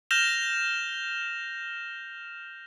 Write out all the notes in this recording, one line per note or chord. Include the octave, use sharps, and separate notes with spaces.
F6 G6 A#6 E7 F7 G7